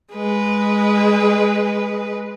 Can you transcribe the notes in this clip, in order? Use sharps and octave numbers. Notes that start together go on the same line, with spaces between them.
G#3 B4